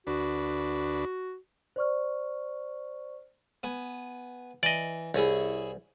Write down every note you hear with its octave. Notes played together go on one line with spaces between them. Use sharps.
D2 D4 F#4 B4
C5 D5 C#6 F6
B3 G#5
E3 D5 D#5
C2 E4 G#4 C#5